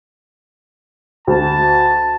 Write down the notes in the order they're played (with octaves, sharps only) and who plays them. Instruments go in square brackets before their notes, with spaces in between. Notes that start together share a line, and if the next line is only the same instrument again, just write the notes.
[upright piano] D2 [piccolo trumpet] A5